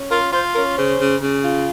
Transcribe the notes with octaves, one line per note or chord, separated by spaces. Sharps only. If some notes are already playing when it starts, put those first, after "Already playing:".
Already playing: C#4
F4 A#4
F4 C5
C#4 A#4
C#3 C5
C#3
C#3
F4